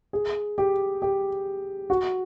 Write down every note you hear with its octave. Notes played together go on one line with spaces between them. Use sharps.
G#4
G4
G4
F#4